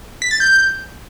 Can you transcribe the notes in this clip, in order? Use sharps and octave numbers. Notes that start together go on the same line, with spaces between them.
B6
A6
G6